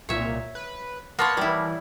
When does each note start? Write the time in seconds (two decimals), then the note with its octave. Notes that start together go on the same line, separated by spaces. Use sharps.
0.09 C2 A#2 C#5 E5
0.55 B4
1.19 A#3 B3 C#5 F#5 A5 C6
1.37 E3 G3 E4